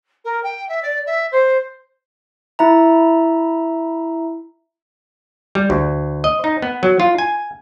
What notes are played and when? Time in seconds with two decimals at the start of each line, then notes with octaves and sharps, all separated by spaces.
0.25 A#4
0.43 G5
0.69 E5
0.82 D5
1.06 E5
1.32 C5
2.59 E4 E5 A#5
5.55 G3
5.70 D2
6.24 D#5
6.44 D#4
6.62 B3
6.83 F#3
7.00 F4
7.18 G#5